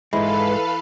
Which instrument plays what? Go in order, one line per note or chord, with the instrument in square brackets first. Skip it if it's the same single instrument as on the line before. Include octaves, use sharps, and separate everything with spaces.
[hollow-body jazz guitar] G#2 G#3 [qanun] E3 [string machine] A4 B4 F5 [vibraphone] B5